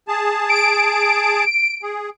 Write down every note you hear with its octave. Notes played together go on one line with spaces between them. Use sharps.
G#4 A5
D7
G#4